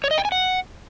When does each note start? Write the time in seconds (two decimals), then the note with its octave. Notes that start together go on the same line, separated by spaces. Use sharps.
0.04 C#5
0.11 D#5
0.18 G5
0.25 G#5
0.32 F#5